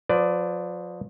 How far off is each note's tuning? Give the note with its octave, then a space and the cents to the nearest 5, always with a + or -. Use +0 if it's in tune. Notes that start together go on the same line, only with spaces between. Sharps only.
F3 +35 B4 +40 D5 +0